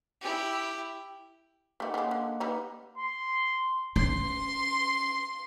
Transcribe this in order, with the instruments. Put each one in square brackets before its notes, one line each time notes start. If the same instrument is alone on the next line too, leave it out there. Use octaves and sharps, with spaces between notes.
[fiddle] E4 G4
[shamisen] G3 A3 [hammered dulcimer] A#3 D#4 F#5
[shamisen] C#3 G#3 [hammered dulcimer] D6
[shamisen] D3
G3 B3 D#4
[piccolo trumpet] C6
[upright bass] C#4 [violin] C6